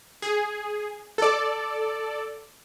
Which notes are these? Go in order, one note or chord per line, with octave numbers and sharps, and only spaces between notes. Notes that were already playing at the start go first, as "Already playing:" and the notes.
G#4
A4 D5